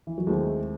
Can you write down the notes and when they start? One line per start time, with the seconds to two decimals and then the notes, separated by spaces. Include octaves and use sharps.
0.07 E3
0.18 F#3
0.27 D#2 D#3 G#3 A3 C4 E4